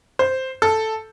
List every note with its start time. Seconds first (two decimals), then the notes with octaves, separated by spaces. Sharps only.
0.19 C5
0.62 A4